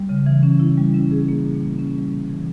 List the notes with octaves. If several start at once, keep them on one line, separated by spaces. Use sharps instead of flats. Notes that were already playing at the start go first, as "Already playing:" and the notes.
Already playing: G3
C#3
E3
C#4
E4
G3
C#4
G#4
A#3
A#2
G3
C#4
G3
C3
E3